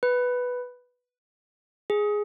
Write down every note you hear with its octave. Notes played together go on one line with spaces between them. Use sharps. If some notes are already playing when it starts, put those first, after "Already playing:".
B4
G#4